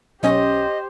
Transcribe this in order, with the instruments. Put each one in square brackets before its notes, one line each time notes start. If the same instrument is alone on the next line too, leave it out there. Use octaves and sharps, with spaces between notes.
[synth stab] B1 C#4 [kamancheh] G4 C5 [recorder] D#5